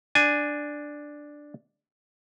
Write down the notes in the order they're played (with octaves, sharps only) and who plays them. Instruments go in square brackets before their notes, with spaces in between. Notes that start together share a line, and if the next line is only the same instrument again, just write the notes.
[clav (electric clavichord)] D4 G#5